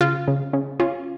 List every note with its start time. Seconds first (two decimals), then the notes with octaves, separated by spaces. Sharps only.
0.01 C#3 F4
0.28 C#3
0.53 C#3
0.80 C#4 F4